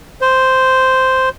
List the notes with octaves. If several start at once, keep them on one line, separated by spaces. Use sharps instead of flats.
C5